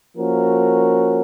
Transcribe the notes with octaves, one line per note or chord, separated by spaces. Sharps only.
F3 A#3 C#4 F#4 A#4